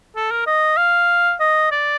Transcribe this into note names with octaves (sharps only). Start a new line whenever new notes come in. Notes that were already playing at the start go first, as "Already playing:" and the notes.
A4
A#4
D#5
F5
D#5
D5